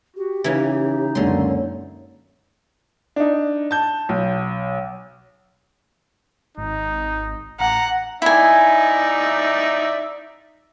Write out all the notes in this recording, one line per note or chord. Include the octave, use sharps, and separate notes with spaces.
F#4 G4
C#3 E3 D#4
C#2 F#2 A#2 D3 C#5 C6
D4 D#4
A5 G6
B1
G#1 D#4
A1 F#5 A#5
D#4 E4 D5 E5 G#5